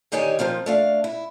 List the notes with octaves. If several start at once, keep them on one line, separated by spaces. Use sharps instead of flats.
D3 D#3 D#4 G4 C#5 G#5
F3 A#3 C4 F4
A3 D4 F5
E4